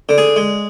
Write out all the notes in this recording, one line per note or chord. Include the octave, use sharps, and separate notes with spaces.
D3
G#4
G#3